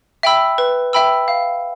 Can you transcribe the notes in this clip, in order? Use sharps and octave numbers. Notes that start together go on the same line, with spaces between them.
E5 G5 B5 E6
B4
E5 G5 B5 E6
F5